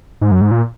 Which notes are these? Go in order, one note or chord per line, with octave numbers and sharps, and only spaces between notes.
G#2
F#2
G#2
A#2